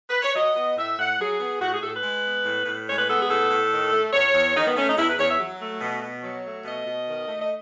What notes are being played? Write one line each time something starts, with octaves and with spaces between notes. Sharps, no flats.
B4
C#5
F#3 D#5
B3
A2 E5
A2 F#5
F#3 G#4
B3
A2 F#4
G#4
A2 A4
B4
G#3
B3
A2
A2
G#3 C#5
B4
B3 A4
G#4
A2 A4
A2
D#3
A3
E2 C#5
E2
D#3 D#4
B3
A3 C#4
D#4
E2 E4
B4
E2 C#5
E5
F#3
A3
B2
B2
F#3
A3
B2 D#5
B2
D#3
A3
D#5